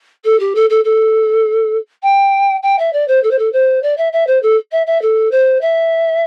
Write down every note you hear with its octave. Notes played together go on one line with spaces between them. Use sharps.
A4
G4
A4
A4
A4
G5
G5
E5
D5
C5
A4
C5
A4
C5
D5
E5
E5
C5
A4
E5
E5
A4
C5
E5